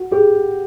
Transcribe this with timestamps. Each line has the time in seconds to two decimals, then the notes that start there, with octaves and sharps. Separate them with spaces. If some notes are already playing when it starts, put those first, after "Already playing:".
Already playing: F#4
0.12 G4 G#4